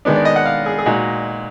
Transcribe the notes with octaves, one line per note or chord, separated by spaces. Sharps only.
D#3 G#3 B3 D4
D5
D#5
F#5
F5
G#4
G#4
A#2 G#3 D#4 F#4